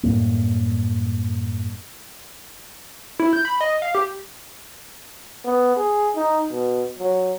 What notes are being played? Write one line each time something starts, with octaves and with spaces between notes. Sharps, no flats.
F#2 A2 G3 A#3
E4
G6
B5
D#5
F5
G4
B3
G#4
D#4
B2
F#3